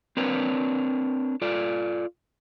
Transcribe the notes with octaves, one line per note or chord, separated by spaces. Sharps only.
C4 D4 A#4 B4 C#5
F4 A4 D5